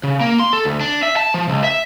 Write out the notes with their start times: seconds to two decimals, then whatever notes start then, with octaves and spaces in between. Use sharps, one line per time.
0.03 C#3
0.20 A#3
0.39 C6
0.53 A4
0.65 D2
0.81 D4
1.03 E5
1.17 A5
1.34 F3
1.48 C#2
1.64 E5